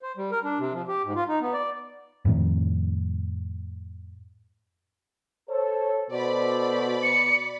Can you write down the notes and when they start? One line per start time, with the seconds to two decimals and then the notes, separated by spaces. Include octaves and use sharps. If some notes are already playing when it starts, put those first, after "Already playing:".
0.02 C5
0.17 G3
0.32 A#4
0.44 D4
0.59 C3
0.73 F3
0.88 G4
1.04 G#2
1.15 F4
1.28 D#4
1.41 B3
1.53 D5
2.25 F2 A2 D#3
5.49 A4 C5 C#5
6.10 B2 F#4 A4 C5 D5 B5
7.03 C#7